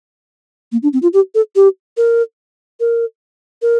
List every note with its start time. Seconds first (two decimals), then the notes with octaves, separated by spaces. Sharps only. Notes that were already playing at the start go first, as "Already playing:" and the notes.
0.72 A#3
0.83 D4
0.93 C4
1.02 F4
1.13 G4
1.35 A4
1.55 G4
1.97 A#4
2.80 A#4
3.62 A#4